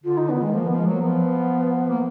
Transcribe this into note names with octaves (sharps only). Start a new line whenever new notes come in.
D3 F4
D#4
D#3 B3
D#3 G#3
F3 A#3
F3 B3
G#3
F#3 A#3
F3 B3
A#3